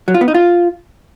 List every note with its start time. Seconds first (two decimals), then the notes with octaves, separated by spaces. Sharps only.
0.08 F#3
0.14 F4
0.21 B3
0.28 D#4
0.34 F4